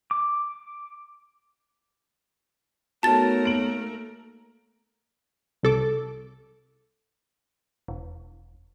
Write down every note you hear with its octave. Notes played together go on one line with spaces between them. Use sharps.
D6
A3 B3 D#4 F#4 A#4 C#5 A5 A6
A#3 D7 F#7
C2 A4 D6
E1